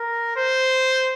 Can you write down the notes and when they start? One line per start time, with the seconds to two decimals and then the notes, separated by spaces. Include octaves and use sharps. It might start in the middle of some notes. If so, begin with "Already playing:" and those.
Already playing: A#4
0.36 C5